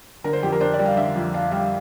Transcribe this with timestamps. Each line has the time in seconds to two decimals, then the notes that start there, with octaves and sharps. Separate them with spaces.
0.24 D3 A#4
0.33 C5
0.43 F2 G4
0.52 A#4
0.60 D4 C5
0.74 D5
0.79 G3
0.86 F5
0.97 D3 E5
1.15 F2
1.34 D4 F5
1.51 G3 F5